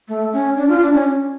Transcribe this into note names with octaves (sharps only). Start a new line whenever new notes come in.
A3
C#4
D4
F4
D4
C#4